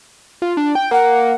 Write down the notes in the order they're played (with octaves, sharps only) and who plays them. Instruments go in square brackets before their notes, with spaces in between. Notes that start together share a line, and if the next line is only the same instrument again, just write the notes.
[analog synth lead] F4
D4
G5
[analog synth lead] A#3 [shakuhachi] F#5
[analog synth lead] A#3